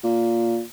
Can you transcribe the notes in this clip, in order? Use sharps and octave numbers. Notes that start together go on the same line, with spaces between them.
A#2